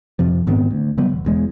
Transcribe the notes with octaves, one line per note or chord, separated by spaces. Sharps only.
F2 C3 F3
G#2 D#3 B3 C4
D2
C#3 F#3 G3 B3
E1
E1 E2 G#3